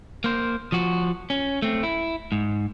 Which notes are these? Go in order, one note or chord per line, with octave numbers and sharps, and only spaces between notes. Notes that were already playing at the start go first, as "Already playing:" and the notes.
A#3 C5
F3 F#4
C#4
A3 C4
E4
G#2